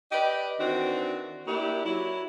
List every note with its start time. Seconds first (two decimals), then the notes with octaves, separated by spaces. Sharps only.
0.12 G4 B4 D5 D#5
0.60 D#3 E3 C4 D4 F#4
1.47 A#3 D4 E4 G4
1.85 F#3 E4